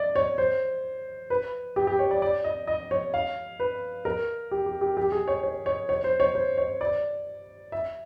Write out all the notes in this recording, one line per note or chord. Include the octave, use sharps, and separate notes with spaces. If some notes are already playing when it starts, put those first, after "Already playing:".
Already playing: D5 D#5
C#5
C5
B4
G4
G4
C#5
D5
D5
D#5
D#5
C#5
F5
B4
A#4
G4
G4
G4
G4
G#4
C#5
C#5
C#5
C#5
C5
C#5
C5
C#5
D5
E5